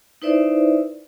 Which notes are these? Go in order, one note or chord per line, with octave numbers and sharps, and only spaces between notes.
D#4 E4 B4 C5 D5 E5